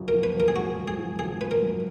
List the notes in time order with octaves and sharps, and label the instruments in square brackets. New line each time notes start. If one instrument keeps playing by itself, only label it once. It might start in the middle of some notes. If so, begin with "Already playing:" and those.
Already playing: [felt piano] G#1 F#2 F3 G#3
[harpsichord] A#4
[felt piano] F3
[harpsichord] B4
[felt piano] G#1
[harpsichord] A#4
G#4
[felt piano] G#3 [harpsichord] F#4
[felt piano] F#2
[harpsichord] G#4
[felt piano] F3
[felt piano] G#1 [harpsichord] G#4
[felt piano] G#3 [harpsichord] B4
[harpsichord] A#4
[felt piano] F#2